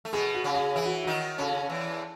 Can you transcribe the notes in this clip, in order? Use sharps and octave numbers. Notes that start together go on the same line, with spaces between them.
A3
B2 B3 G#4
F#4
C#3 C#4
G#4
E3 E4 G#4
F#4
D#3 D#4 F#4
C#3 C#4 A4
E2 E3